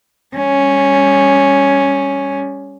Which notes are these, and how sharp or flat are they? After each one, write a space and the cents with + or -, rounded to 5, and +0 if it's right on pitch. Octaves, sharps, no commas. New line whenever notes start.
G3 +30 C#4 +0